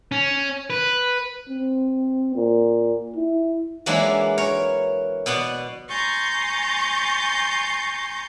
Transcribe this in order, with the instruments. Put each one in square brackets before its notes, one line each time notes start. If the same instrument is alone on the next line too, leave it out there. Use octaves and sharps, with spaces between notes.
[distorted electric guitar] C#4
B4
[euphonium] C4
A#2
E4
[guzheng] E3 F#3 G#3 A#3 D4 E4
A#4 C#5
B2 B3 D5 F#5
[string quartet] G#5 A#5 C6 C#6 G6 A6